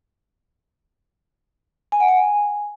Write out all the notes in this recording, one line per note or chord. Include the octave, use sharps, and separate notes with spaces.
G#5
F#5
G#5